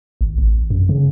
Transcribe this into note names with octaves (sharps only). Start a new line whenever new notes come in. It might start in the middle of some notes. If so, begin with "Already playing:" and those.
G#1
A1
F#2
C#3